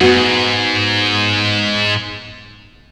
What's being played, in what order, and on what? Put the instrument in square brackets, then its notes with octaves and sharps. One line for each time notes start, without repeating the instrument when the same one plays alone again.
[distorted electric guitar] G#2 [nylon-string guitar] B3 F#4